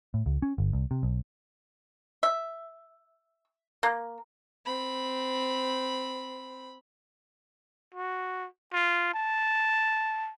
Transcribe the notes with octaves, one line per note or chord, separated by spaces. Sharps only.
A2
C#2
C#4
G1
C2
C3
B1
E5
A#3
C4 B5
F#4
F4
A5